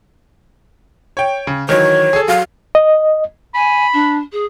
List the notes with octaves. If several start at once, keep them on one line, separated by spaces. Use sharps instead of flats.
C#5 G5
C#3
D#3 E3 F#3 C#5
G#4 A4
F#3 F5
D#5
G#5 B5
D4
G#4